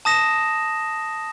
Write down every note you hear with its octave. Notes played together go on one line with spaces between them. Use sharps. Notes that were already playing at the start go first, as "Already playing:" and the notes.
A5 D#6 A#6 E7